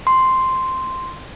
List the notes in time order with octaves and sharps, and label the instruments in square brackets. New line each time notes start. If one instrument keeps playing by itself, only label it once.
[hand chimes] C6